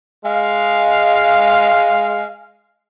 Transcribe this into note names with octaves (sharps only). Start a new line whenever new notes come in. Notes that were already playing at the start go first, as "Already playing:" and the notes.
G#3 F5